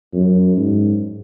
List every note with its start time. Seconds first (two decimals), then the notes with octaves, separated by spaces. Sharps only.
0.13 F#2
0.57 G#2